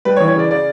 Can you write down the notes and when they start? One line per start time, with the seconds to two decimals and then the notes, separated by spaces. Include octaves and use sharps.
0.05 G3 B4
0.16 C#5
0.20 E3
0.28 C#5
0.35 C#3 D5
0.51 C#3 D5